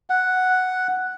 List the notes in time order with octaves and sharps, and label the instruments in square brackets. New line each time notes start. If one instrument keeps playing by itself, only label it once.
[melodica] F#5